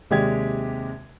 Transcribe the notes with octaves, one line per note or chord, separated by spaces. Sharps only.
D#2 C3 G#3 G4 D5 G#6